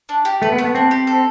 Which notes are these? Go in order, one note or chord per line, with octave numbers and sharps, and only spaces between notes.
D4
G4
A3 B4
B3
A3
B3
C4 D4
G4
A4